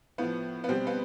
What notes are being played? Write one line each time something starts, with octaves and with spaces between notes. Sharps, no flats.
A2 F3 B3
B3
B2 G3 C4
B3